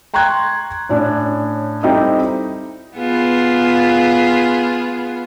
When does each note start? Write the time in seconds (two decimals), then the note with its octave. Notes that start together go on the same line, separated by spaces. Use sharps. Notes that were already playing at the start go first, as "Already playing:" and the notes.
0.14 G5 A#5 C6 C#6 F#6 G#6
0.89 A2 C#4 D4
1.83 G3 C4 D#4 E4 A4 D#5
2.97 B3 F4 G#4